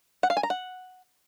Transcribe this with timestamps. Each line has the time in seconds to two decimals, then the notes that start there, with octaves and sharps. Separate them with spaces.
0.23 F#5
0.30 F5
0.37 G#5
0.43 A#5
0.50 F#5